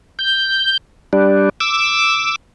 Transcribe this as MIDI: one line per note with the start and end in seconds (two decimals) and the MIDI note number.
0.19 0.77 91
1.13 1.49 55
1.13 1.49 62
1.60 2.36 86
1.60 2.36 88